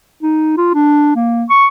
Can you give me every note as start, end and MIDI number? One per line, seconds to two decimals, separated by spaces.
0.23 0.55 63
0.58 0.73 65
0.74 1.14 62
1.15 1.44 58
1.50 1.67 85